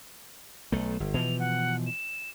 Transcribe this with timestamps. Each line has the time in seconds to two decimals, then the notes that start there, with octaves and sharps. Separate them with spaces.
0.72 B1 A3
1.00 G1
1.14 B2 E3 F3 F7
1.39 F#5
1.87 E7